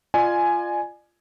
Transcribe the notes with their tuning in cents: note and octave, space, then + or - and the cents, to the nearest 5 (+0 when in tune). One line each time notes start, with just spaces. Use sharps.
F4 -10 D5 +40 G#5 +5